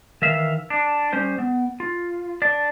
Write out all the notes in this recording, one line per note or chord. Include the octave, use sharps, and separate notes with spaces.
D#3 E3 E5 F5
D4
G3 C#4 C5
B3
F4
D4 D5